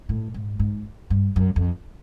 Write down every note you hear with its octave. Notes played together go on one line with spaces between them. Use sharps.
A2
G#2
G#2
G2
F#2
F2